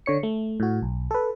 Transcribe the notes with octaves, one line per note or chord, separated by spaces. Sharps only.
D3 C#5 C#7
A3
A2 F#4
B1
A4 B4